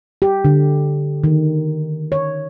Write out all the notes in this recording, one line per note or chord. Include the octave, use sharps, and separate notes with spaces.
G4
D3
D#3
C#5